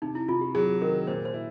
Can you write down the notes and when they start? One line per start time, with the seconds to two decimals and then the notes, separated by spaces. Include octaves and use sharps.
0.02 C3 D#4
0.15 E4
0.28 C3 F4
0.41 G4
0.55 F#3 G#4
0.81 D#3 A#4
1.07 A#2 C5
1.25 C5
1.34 E4